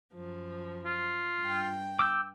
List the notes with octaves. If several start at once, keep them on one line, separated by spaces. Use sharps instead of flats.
F#2 F3
F4
G2 G5
D6 E6 G6